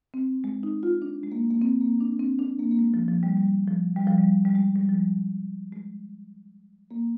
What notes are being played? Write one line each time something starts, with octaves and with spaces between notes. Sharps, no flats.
C4
G#3
D#4
F4
D4
G#3
A#3
A#3
C4
A#3
D4
D4
C4
D4
A#3
A#3
G#3
F3
F3
G3
G3
F3
G3
F3
G3
G3
G#3
G3
F3
G3
G#3
A#3